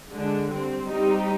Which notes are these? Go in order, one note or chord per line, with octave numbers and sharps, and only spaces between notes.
D3 G#3 D4
G3 C4
G3 C4 D#4 G4